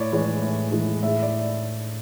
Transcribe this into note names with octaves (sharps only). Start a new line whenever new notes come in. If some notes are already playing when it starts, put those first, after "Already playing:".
Already playing: A2 C#5 D5
E3 G#3 C#5
A2
E3 G#3
A2 E5
D5